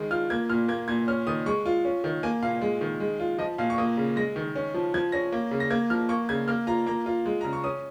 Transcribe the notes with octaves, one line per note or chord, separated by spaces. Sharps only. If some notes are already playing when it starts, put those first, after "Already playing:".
Already playing: D#3 G#3
F4 F6
A#3 G#6
A#2 F6
A#3 G#6
A#2 G#6
C#4 F6
D#3 D#6
G#3 C#6
F4
C#4
D#3
A#3 G#5
A#2 F5
G#3
D#3
G#3
F4
F3 D#5
A#2 F5
C#6
A#3 D#6
C#3
G#3 A#6
D#3
C#4
F3
F3 G#6
C#4 A#6
A#3
C#3
A#6
A#3 G#6
F3 F6
A#3 C#6
C#3 G#6
A#3 F6
F4 A#5
A#3 A#5
F4
G#3
C#3 A#5
C#6
C#4 D#6